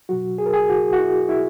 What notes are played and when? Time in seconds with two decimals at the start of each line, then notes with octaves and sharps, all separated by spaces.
0.09 B2 F#3 F#4
0.38 G#4
0.46 A#4
0.53 G#4
0.69 F#4
0.93 F#4
0.99 E4
1.29 E4